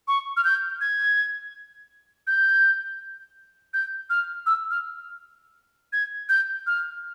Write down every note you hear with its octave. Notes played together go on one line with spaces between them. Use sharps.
C#6
F6
G6
G#6
G6
G6
F6
E6
F6
G#6
G6
F6